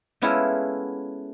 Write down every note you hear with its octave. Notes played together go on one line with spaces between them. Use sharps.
G#3 B3 C#4 E4 F4 A4